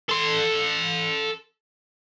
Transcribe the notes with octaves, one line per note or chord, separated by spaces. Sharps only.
A4 C6